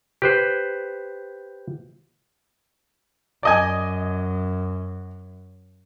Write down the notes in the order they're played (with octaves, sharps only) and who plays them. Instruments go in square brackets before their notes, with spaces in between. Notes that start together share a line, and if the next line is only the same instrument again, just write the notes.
[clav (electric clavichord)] G4 B4 C5
[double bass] F#2 [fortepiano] D5 D#5 G#5